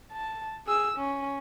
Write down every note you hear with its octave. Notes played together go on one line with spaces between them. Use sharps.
A5
G#4 E6
C#4